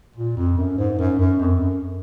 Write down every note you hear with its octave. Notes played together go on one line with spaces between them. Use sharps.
A#2
F2
F#2
G#2
F#2
F#2
F2
F#2